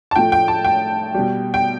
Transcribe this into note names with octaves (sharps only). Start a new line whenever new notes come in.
A5
A2 F3 A3 G5
G5
A5
G5
B2 G3
G5